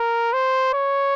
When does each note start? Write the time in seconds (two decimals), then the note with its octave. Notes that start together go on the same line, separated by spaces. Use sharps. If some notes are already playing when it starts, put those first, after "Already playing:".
Already playing: A#4
0.33 C5
0.73 C#5